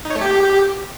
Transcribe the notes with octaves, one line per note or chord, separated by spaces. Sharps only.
D#4
C#5
A3
G4